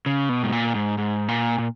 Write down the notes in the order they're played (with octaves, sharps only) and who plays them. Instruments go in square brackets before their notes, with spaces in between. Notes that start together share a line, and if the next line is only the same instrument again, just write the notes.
[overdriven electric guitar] C#3
B2
G#2
A#2
G#2
G#2
A#2
A#2